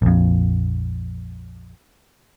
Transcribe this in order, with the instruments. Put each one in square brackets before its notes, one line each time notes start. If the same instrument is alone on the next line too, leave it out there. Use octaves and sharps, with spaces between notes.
[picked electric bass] A#1 F2